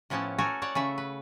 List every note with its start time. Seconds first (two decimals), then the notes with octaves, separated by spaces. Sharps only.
0.10 A2 F3 B3 C#4 E4 A5
0.38 F#4 A4 A#4 C#5 G#5
0.62 C#5 D5 F#5
0.75 C#3 A3 E5
0.98 B4